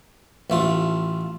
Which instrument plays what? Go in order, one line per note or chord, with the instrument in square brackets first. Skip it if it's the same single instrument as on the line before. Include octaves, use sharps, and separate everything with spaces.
[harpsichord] A1 A3 F4